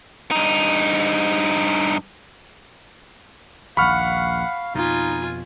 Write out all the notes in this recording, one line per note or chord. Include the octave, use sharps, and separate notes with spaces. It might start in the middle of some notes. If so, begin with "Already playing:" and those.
G2 D#4
A#1 D#2 F5 F#5 B5 C#6 F6
F2 B2 D#4 F4 G#5